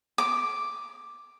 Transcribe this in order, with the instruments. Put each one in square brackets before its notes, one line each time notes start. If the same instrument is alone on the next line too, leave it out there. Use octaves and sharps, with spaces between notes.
[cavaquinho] D6